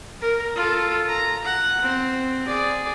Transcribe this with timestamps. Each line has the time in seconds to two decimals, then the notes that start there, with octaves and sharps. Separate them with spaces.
0.21 A#4
0.55 F4 A4
1.09 A#5
1.45 F#5
1.83 C4
2.47 G#4 D5